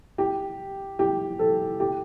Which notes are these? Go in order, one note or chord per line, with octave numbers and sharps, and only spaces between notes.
G4
G4
A4
G4